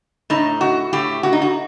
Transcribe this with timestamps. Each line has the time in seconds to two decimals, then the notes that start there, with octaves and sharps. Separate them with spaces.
0.30 A2 D#4
0.61 F#4
0.93 A2 G4
1.23 F#4
1.33 D#4
1.42 F#4